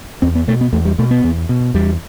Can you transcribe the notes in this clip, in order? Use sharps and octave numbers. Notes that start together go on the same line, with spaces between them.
E2 C4
B3
B2 A3
B3
E2 A3
G3
B2 A3
B3
E2
B2
E2 G3